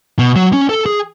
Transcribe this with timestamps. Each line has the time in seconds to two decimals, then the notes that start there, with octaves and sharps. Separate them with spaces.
0.19 B2
0.36 F#3
0.53 C#4
0.69 A4
0.86 G#4